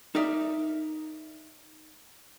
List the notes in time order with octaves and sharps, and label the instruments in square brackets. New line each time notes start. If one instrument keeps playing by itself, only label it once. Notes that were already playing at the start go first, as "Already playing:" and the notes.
[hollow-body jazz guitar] D#4 A#4 D5 E5